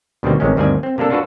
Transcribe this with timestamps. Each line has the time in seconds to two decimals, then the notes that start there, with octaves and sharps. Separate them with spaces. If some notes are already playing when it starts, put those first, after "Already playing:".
0.23 D2 B2 D#3 G3 C4
0.40 A1 C3 D#3 G#3 C#4
0.56 D2 G2 D#3 C4 D5 G#5
0.83 C4
0.98 C3 A#3 D4 A4
1.10 D4 F4 F#4 A4 B4